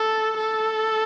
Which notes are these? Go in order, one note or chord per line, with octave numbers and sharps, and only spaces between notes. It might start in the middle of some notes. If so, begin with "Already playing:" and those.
Already playing: A4
A4